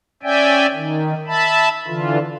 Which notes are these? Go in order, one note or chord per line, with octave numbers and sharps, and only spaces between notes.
C#4 D5 E5 G5 G#5
D#3
E5 A5 B5
D3 E3 F4